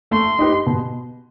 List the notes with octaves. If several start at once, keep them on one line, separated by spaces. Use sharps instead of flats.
A3 C6
D#4 G4 B4
B2